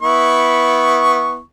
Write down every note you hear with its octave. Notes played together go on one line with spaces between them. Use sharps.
B3 E4 C#6